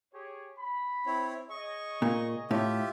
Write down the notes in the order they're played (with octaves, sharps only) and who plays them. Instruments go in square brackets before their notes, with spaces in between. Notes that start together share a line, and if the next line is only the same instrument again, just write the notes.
[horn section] G4 G#4 C#5
B5
[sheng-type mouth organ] C4 E4 C#5
[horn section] G#4 C#5 D#5 [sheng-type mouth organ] C#6
[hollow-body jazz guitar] A#2
[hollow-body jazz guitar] A2 [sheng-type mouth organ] F4 G4 E5